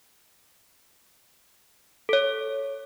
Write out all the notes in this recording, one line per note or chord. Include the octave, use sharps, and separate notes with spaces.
A4 C#5